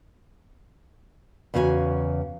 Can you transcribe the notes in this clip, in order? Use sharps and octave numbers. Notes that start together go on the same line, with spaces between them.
E2 C#3 F#4 C5 G#5